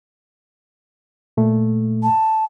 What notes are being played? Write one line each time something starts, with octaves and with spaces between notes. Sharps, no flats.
A#2 A3
A5